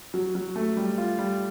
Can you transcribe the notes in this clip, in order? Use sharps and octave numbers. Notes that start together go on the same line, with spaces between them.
F#3
F#3
A3
G3
F4
G3